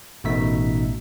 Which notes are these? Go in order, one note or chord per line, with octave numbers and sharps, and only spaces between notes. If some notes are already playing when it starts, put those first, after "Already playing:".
A1 B2 A3 D#4 E5 B6